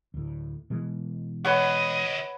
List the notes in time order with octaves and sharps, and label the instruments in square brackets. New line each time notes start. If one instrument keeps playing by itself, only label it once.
[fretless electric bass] D2 A2
B2 E3 G#3
[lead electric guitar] D2 D#5 [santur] B4 C#5 F#5